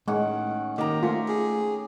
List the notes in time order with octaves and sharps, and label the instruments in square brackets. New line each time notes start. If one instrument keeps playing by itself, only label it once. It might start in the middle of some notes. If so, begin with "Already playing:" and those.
[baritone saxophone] A2 [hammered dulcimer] D#3 C#4 F#5 [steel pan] G#3
[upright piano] D#3 [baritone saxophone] A#3 [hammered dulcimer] G4 A#5
[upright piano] A3 [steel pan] F4
[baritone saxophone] G#4